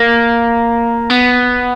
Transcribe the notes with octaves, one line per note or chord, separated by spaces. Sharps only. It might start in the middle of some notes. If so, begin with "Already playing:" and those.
Already playing: A#3
B3